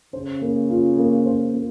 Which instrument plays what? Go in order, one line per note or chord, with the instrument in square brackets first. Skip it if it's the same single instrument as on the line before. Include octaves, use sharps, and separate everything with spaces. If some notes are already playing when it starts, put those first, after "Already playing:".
[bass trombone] C#3 [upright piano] C5
[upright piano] A#3
F4
A#3
C5
A#3